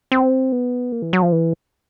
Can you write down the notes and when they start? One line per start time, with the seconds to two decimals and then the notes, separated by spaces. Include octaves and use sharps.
0.12 C4
0.52 B3
0.92 A#3
1.02 E3
1.13 F#3
1.22 F3
1.32 E3